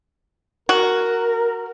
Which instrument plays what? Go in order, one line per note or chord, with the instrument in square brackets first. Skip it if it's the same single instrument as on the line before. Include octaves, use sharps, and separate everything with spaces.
[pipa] F#4 [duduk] A#4